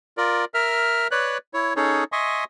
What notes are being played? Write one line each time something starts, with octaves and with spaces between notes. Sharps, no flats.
F4 A#4 D5
A#4 E5 F6
B4 C#5 D5 F#6
E4 C#5
C#4 D#4 G#4 A4 C#5
D#5 E5 G#5 C6 C#6 D#6